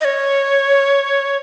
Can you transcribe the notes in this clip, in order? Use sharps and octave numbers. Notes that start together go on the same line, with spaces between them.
D#5
C#5